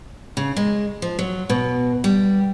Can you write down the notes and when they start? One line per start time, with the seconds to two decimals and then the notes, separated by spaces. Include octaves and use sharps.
0.37 C#3
0.57 G#3
1.02 F3
1.19 F#3
1.50 B2
2.04 G3